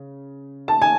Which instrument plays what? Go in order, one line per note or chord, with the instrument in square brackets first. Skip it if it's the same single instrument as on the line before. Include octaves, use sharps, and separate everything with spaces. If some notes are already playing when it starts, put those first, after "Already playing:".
Already playing: [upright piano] C#3
A5
G#5